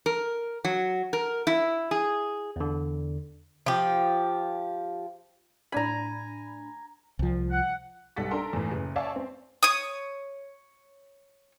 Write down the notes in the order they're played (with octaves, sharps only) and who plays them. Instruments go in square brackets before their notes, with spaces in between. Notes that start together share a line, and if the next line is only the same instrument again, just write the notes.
[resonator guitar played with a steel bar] A#4
F#3
A#4
E4
G#4
[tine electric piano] E2 D3
[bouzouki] F3 G4
[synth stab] A2 D4 B5 [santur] G#5 A#5
[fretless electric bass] C2 F3
[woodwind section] F#5
[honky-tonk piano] B1 G3 A4 F#5 A6 B6
D4 A4 A#4 A#5 C6
E2 A2
F#1
C#5 D5 E5 F5 G#5 A5
C4
[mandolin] C#5 D#6